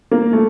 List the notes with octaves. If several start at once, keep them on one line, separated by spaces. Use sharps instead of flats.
A#3
A3